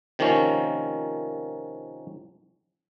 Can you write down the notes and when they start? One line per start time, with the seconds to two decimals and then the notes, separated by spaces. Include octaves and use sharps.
0.19 C3 D#3 F3 A#3 C#4